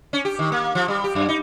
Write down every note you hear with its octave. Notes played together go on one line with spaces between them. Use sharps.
C#4
G4
D#3
A#3
F3
G3
G4
F#2
D#4